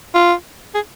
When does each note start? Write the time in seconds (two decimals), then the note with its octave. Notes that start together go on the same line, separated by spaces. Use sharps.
0.15 F4
0.75 G#4